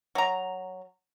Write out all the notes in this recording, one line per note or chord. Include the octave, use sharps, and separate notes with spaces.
F#3 A#5